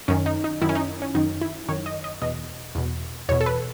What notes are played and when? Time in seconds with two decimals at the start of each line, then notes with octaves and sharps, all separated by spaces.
0.08 F#2 D#3 C#4
0.26 D#4
0.44 D#4
0.62 F#2 D#3 E4
0.69 C#4
0.75 D#4
1.02 C#4
1.15 F#2 D#3 D#4
1.41 E4
1.68 F#2 D#3 C#5
1.86 D#5
2.04 D#5
2.22 E2 B2 D#5
2.75 E2 B2
3.29 E2 B2 C#5
3.41 A4
3.46 B4